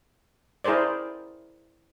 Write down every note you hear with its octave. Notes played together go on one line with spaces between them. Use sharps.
E4 G#4 A#4 C5 D5